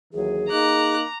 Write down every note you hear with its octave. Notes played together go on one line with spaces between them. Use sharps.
D#2 E3 F#3 G#4
A#3 D#4 A#5 D6 F#6